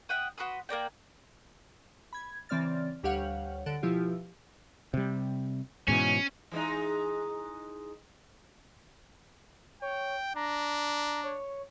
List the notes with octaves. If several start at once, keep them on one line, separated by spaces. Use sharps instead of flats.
E5 F#5 G5 D#6
F#4 B4 C6 D#6
A#3 A#4 D5 G5
B5 G#6
C#3 E3 C4 D5 F6 A6
D2 G3 G4 C#5 F5 F#5
D3 A4 F#5 D7
B2 F3 E4 F4 G4
C3 G3
G#2 B2 E3 C#4
E3 G#3 D#4
C#5 G5
D4 A#5
C#5